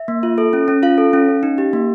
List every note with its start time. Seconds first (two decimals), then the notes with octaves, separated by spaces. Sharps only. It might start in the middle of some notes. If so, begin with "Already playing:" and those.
Already playing: E5
0.08 A#3
0.23 F4
0.38 A4
0.53 C#4
0.68 C#4
0.83 F4 F5
0.98 A4
1.13 C#4
1.28 C#4
1.43 D#4
1.58 G4
1.73 A#3